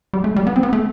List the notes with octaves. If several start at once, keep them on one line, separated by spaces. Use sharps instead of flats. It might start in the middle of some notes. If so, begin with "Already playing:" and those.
G3
A3
G3
B3
C4
B3
A3